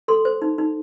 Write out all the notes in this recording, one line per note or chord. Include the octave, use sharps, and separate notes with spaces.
A4 C6
C5
D#4
D#4